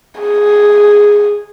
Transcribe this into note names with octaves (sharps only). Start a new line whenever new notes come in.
G#4